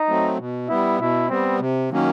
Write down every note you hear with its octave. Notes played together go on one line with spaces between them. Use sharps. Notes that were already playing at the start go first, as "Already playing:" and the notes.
Already playing: D#4
F#3 A3 C4
B2
G3 B3 E4
B2 E4
G3 B3 C4
C3
D#3 F#3 A#3 C#4